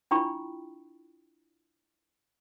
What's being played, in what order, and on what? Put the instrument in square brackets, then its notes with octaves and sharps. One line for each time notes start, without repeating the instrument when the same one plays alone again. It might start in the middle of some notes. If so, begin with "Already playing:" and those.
[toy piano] D4 E4 F4 G5 B5 C#6